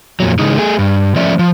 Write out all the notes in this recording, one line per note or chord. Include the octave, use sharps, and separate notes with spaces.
F2 A#2 F#3
C#3 E3 G#3 D#4
A3 G#4
G2
F3 A3 C#4 D5 E5
F3